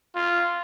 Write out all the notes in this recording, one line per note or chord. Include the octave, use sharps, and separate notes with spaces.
F4